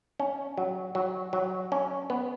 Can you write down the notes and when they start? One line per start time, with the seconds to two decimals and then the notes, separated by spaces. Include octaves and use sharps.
0.19 C#4
0.57 F#3
0.95 F#3
1.33 F#3
1.72 C#4
2.10 B3